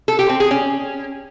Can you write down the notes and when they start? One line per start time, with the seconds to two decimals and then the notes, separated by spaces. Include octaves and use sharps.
0.08 A4
0.19 G4
0.29 C4
0.40 G#4
0.51 C#4